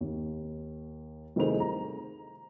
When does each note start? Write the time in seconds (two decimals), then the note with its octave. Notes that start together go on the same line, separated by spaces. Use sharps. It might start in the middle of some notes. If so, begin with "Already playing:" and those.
0.01 D#2
1.36 C2 D#3 A3 G#4 C5 F7
1.60 A#5